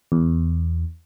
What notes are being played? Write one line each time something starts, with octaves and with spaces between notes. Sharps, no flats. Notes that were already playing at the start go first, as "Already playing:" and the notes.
E2